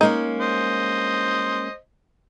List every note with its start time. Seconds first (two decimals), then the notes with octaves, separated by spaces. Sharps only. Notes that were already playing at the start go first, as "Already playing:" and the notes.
0.01 G#3 A#3 C#4 D#4
0.41 C5 D#5